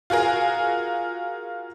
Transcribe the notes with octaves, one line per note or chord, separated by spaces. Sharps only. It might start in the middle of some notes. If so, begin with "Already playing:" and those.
F4 F#4 G#4 A#4